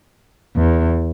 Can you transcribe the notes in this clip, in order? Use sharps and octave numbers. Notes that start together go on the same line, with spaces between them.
E2